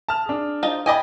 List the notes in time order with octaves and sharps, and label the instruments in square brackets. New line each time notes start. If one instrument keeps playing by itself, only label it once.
[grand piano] A5 F6
D4 G#4
[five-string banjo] D#4 F4 C5
[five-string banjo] D5 D#5 G#5 [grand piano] G5 B5